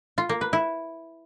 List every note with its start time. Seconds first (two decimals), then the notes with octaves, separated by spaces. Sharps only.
0.18 F4
0.29 A#3
0.41 B4
0.53 E4